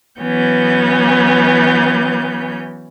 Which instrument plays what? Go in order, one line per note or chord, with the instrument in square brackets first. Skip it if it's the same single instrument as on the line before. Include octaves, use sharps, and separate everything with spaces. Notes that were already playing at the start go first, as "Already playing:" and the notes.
[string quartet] E3 F#3 B3 C#4 G6